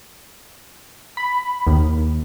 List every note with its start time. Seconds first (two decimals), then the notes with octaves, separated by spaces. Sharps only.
1.17 B5
1.67 D#2